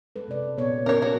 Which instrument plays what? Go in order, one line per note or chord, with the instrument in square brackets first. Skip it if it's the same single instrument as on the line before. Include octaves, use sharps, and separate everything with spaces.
[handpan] G#3 A4 B4
C3 D5
A#2 B3 C#5
[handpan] C#3 B3 C#4 [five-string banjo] A#4 C#5
[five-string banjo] F#4